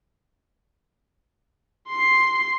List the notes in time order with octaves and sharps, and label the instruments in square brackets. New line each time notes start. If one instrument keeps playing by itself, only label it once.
[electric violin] C6 C7